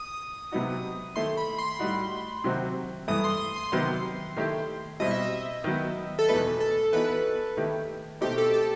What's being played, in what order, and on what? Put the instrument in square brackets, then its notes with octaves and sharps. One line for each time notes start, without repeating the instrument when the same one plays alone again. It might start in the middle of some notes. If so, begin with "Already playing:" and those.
Already playing: [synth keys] D#6
[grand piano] C3 F#3 B3 D#4 F#4
[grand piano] D#3 A3 E4 [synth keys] C6
[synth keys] B5
C6
[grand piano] A2 G3 D#4 F#4
C3 D#3 F#3 C4 F#4
[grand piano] G2 E3 A3 [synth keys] D#6
[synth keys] C6
D#6
C6
[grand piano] C3 D#3 F#3 B3
D#3 A3 E4 G4
[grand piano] B2 G3 C4 E4 [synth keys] D#5
[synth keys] E5
D#5
[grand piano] D#3 F#3 B3
[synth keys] A4
[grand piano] E2 B2 A3 D#4 [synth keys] B4
[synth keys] A4
[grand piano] E3 B3 D#4 F#4 [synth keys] B4
[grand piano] D#3 A3 E4 G4
[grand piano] B2 A3 C4 D#4 [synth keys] G4
[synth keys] A4
A4